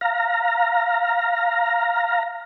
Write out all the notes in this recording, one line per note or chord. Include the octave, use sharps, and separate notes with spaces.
F5 A#5